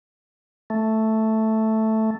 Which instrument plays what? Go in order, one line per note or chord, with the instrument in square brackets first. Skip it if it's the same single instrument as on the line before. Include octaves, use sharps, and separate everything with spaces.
[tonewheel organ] A3